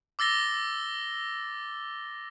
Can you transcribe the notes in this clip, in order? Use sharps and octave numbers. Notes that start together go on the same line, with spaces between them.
D6 E6 A6 A#6 G7